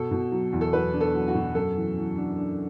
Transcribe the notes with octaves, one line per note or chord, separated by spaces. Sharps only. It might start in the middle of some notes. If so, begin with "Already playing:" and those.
Already playing: B2 A4
B2
F#3
E2
A4
F#3 B4
D4
A4
F#3
F#4
B2
F#2 A4
E3
E3
D4
D4